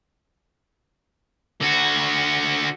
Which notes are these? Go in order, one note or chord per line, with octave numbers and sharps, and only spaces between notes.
D3 F#4